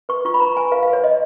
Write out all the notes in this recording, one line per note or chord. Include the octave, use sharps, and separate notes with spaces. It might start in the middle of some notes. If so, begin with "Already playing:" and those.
B4 C#6
F4 C#6
B5
B4 A#5
B4 G#5
B4 F5
F5
B4
C#5
C#5 D#5